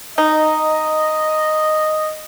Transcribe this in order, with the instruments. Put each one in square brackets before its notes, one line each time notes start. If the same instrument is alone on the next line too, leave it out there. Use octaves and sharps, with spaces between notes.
[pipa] D#4 [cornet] D#5